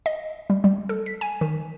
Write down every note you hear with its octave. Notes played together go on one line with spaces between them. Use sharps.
D#5
G3
G3
A4
B6
G#5
D#3